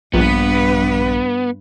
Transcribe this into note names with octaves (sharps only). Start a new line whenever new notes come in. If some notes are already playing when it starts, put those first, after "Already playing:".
A#1 G2 B3 B4